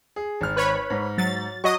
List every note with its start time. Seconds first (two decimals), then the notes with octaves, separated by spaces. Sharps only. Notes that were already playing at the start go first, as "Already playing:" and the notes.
0.16 G#4
0.41 G#1 F6
0.56 B4 C#5 B5
0.90 G#2
1.18 F#3 A6
1.64 F#3 D#5 C#6 D#6